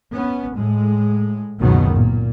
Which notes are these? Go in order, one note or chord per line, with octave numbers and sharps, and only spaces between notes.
B3 C#4
A2 G#3
F#1 C#2 B2 D#3 F#3 B3
A#2